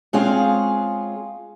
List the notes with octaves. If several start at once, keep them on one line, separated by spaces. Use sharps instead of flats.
G#3 C4 C#4 F4 G#4 F5